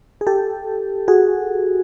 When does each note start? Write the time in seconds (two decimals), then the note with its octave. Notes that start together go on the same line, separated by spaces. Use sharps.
0.21 G#4
0.27 G4 A4
1.08 F#4 G#4